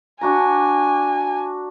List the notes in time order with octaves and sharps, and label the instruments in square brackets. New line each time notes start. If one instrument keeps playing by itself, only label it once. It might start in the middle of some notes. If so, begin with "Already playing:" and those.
[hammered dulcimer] D4 F#4 A#5 [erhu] G#5